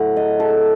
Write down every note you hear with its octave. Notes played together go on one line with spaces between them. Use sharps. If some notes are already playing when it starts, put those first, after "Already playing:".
Already playing: A2 F#3 A3 F#5
D#5
A4